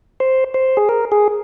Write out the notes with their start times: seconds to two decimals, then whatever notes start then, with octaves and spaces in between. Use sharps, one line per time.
0.20 C5
0.54 C5
0.77 G#4
0.89 A#4
1.12 G#4